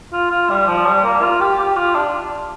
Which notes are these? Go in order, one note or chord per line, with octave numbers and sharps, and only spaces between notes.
F4
F4
G3
F3
G3
A#3
F4
G4
G4
F4
D4